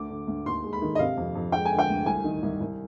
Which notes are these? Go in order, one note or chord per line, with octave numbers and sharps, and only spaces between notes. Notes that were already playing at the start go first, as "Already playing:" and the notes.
Already playing: D2 D6
D3
D2
D#2 C6
G#3
B5
D#3
D#5
C3 F5
F2
F2
G#3 G5
G#5
D3
G5
D2
C2 G#5
D#3
C2
C2